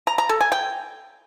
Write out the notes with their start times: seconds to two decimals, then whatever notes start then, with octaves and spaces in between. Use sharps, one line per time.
0.07 A#5
0.18 A#5
0.29 A4
0.41 G#5
0.52 G5